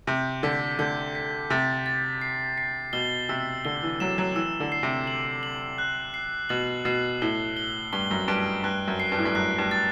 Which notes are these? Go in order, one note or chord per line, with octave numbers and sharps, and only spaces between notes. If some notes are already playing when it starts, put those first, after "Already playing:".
C3 G6
D3 B6
D3 G6
B6
C3 A6
A6
C7
C7
B2 G7
C3 E6
D3 G7
E3
F#3 E7
F#3
E3 E6
D3
C7
C3
F#7
F#7
F#6
C7
B2 F#7
B2 C7
A2 G7
G7
G2 G7
F#2
G2 D7
G2 F#6
F#2
C7
G2
A2
G2
F#2 F#6
G2
A6